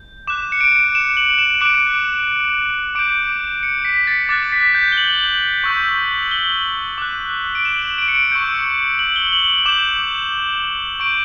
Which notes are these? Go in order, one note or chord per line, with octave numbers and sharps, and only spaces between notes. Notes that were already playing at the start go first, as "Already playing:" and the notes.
Already playing: G6
D6 F#6 E7
C#7
D7
E7
F#7
E7
D6 F#6 D7
D6 G6 D7
C#7
B6
A6
D6 F#6 A6
B6
G6
G7
F#7
C#6 E6 G6
F#7
G7
D6 F#6
D7
E7
F#7
E7
D7
C#7
D7
C#6 E6 G6
F#7
G7
F#7
F#7
D6 G6 E7
C#6 G6 D7